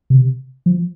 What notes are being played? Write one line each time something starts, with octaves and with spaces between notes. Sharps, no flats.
C3
F3